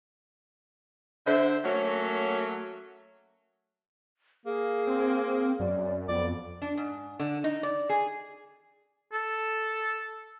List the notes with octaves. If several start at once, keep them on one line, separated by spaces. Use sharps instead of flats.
D3 C5 E5
F#3 A3 A#3 C#4 F#4 C#5
A#3 G#4
C4
F#2 D5
F2 B3 D5
D4
G#2
D3
D#4
D5
G#4
A4